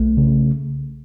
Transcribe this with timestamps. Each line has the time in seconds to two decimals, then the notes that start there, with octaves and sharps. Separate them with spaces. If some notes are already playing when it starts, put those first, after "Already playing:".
Already playing: B1 A3
0.17 C#3